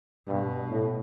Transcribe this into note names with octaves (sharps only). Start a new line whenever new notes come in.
G2 B2
A2